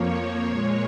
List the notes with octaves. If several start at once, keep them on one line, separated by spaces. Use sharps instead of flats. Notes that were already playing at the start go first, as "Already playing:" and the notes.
Already playing: F2 F3 A#3 C#5
A#2 G#3